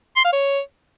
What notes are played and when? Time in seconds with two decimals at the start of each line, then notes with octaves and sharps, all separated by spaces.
0.16 C6
0.25 F5
0.33 C#5